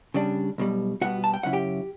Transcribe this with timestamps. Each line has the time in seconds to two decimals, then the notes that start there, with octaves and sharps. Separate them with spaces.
0.14 C#3 G3 D4
0.58 B1 B2 G3
1.01 B2 G3 B3 F#4 F#5
1.24 A5
1.34 G5
1.43 F#2 C#3 F#3 C#4 E4 F#5
1.53 G4 G5